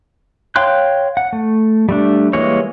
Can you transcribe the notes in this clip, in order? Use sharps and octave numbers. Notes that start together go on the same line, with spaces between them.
C#5 F5 G5 C6 F#6
F#5
A3
G3 A3 D4
E3 G3 G#3 A#3 C#5